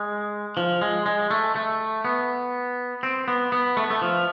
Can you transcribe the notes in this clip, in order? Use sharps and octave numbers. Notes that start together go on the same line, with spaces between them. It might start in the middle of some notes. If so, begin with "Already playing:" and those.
Already playing: G#3
F3
G#3
G#3
A3
A3
B3
C4
B3
B3
A3
B3
A3
F3